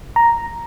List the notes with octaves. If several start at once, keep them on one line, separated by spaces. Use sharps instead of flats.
A#5